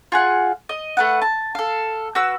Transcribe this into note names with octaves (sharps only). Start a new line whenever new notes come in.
F4 G#4 F#5
D#5
A3 B4 F#5
A5
A4 F5
F#4 B4 E6